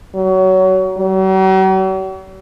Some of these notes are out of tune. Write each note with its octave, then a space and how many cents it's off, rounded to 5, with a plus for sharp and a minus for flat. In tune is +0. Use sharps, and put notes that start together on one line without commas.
F#3 +25
F#3 +45